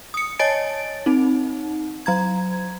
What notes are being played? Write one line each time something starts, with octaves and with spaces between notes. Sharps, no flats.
D#6 C#7
C#5 D#5 G#5 A5 A6 D7
C4 D#4
F#3 A#5 G#6